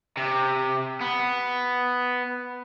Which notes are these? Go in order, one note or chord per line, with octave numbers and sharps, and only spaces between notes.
C3
B3